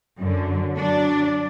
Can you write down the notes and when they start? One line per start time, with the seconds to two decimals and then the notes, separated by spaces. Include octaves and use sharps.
0.19 F#2 D3
0.77 F#3 D4